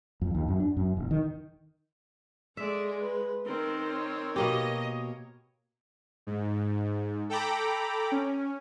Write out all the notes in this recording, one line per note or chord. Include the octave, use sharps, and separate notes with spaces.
F2
D#2
F#2
D4
F#2
E1
D#3
G#3 A4 D5 E5
B4
D#3 C4 A#4
A#4 C#5
B2 A#3 G4 D#5
G#2
A4 G5 A#5 B5 D6
C#4